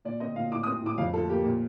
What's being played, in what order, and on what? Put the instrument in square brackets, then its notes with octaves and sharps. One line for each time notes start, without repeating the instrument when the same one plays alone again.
[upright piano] A#2 D5
C4 D#5
A#2 F5
A2 D6
D#6
C4
A2 D6
F2 F5
F3 A4
A#3 G4
A#2